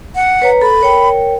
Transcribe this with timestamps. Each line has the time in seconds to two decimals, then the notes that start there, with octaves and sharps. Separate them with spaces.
0.15 F#5
0.42 B4 C#5 A#5
0.62 A4 B5
0.81 A#4 C#5 G5